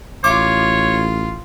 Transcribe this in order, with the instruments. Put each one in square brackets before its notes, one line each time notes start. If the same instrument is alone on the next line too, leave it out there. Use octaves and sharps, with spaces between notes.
[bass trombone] A1 [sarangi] F4 [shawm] C#5 [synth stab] D6